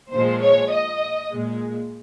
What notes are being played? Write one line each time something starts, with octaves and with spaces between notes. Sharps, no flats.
A#2 F3 G#3 C5
C#5
D#5
A#2 G#3